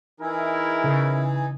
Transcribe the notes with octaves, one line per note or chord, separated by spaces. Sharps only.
E3 D#4 E4 G#4 A#4
C#3